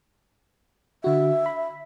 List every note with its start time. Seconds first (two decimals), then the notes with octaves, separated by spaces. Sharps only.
1.04 D3 F#4 E5
1.46 B5